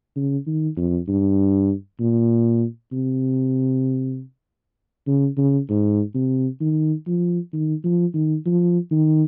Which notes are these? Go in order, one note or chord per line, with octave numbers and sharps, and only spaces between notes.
C#3
D#3
F2
G2
A#2
C3
C#3
C#3
G#2
C3
D#3
F3
D#3
F3
D#3
F3
D#3